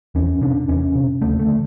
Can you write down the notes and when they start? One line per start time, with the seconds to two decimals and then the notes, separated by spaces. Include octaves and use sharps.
0.15 E2 C#4
0.41 C3 D4
0.68 E2 C#4
0.95 C3
1.22 D2 A3
1.39 A3
1.48 D3